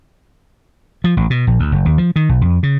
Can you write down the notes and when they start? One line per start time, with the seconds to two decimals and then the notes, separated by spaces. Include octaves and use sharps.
1.04 F3
1.17 A1
1.30 B2
1.47 A#1
1.60 D2
1.72 F#1
1.85 D#2
1.98 F3
2.16 D#3
2.29 B1
2.41 F2
2.63 C#3